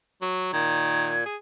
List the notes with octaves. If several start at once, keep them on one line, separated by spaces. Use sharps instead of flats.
F#3
A#2 D#3 G#6
G#4